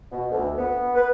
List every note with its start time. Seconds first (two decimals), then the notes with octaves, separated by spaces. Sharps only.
0.12 B2
0.31 D2
0.58 B3
0.95 B4